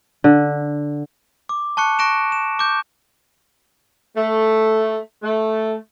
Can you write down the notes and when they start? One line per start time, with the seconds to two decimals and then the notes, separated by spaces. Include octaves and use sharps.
0.24 D3
1.49 D6
1.77 A5 C#6 F#6 C#7
1.99 C#6 F#6 A#6 D7 E7
2.32 E7
2.59 D6 G6
4.16 A3
5.22 A3